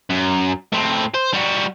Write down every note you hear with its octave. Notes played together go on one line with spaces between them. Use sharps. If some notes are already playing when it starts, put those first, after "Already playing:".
F#2
A2 C4
C5
G3 F#4